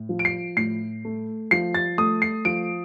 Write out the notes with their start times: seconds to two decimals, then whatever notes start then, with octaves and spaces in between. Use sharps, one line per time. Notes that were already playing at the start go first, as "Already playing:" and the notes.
Already playing: A2
0.09 F3
0.19 D7
0.25 C7
0.57 A2 C7
1.05 A3
1.51 F3 C7
1.75 A6
1.98 A3 D#6
2.22 C7
2.45 F3 D7